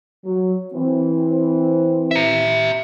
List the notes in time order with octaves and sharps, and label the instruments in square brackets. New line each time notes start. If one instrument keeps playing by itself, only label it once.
[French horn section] F#3
E3 C4
[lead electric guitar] E5 A#5